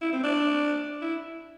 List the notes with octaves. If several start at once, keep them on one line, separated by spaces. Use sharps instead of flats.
E4
C4
D4
E4